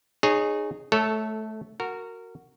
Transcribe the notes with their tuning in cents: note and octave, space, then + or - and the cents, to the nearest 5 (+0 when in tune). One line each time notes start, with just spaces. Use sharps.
D#4 -30 G#4 +0 C#5 -10
A3 -15 A4 +0 C#5 +0
F#4 +0 A#4 -20